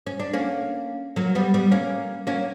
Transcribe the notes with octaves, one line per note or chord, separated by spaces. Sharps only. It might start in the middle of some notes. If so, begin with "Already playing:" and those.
C#4
D4
A#3 C#4
F#3 A#3
G3 B3
G3 B3
A#3 C#4
A#3 C#4